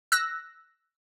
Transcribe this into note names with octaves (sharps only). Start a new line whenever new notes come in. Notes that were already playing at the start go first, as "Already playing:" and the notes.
E6 F#6 A#6